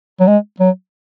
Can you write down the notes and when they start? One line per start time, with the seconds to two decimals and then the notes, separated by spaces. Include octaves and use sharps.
0.20 F#3
0.27 G#3
0.60 F#3